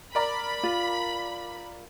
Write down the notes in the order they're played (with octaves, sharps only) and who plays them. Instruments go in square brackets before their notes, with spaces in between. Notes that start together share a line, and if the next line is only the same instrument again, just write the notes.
[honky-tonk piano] A#4 D5 A#5 [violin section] B5
[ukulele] F4